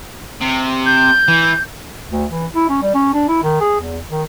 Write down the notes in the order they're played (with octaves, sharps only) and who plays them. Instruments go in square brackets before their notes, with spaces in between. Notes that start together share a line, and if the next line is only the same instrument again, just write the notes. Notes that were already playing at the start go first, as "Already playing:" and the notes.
[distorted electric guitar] C3
[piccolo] G6
[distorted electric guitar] E3
[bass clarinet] D2
E3
E4
C#4
G3
C#4
D4
E4
D#3
G#4
E2
D#3